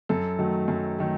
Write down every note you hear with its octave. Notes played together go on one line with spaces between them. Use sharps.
F#2 A4
D#3 F#3 A3
F#2
D#3 F#3 A3